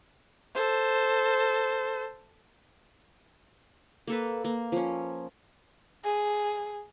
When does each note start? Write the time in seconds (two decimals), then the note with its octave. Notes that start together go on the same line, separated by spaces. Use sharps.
0.54 A4 C5
4.07 A#3 A4 B4
4.44 A#3
4.72 F3 C#4
6.04 G#4